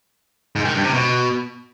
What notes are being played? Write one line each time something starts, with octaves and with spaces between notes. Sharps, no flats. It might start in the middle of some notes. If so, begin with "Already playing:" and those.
G#2
D#3
G2
C3
B2